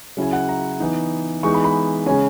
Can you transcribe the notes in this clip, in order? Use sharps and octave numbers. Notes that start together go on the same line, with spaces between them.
C#3 F#3 C#4 E4 G#5
F#5
A#5
E3 B3 D#4
E3 G#3 B3 D#4 C#6
B5
B5
C#3 G#3 C#4 G#5